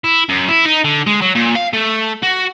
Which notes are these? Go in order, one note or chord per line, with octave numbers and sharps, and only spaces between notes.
E4
F#2
E4
D#4
D3
G#3
F#3
A#2
F5
A3
F#4